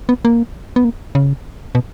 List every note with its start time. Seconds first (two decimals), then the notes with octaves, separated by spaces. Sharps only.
0.09 B3
0.25 A#3
0.76 B3
0.84 A#3
1.15 C#3
1.75 B2